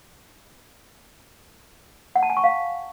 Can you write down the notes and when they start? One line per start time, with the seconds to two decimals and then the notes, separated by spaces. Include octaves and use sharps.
2.16 F#5
2.23 A5
2.30 G#5
2.37 C#6
2.44 F5